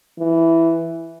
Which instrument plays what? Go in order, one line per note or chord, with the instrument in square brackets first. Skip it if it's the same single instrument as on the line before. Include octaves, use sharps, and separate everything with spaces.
[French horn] E3